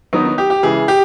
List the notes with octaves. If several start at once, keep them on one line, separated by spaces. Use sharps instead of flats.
D#3 F#3 B3 D#4
D#4
G4
G4
C#3 E3 G#3 G#4
G4